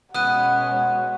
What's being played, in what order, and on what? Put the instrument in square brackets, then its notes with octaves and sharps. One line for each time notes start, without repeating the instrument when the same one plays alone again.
[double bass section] B2 G#3 C#4 [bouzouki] B3 [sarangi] F#4 [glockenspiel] D#6 F#6 D#7